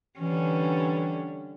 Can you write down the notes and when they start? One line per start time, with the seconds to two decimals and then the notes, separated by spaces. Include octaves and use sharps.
0.19 D3 E3 G3 C#4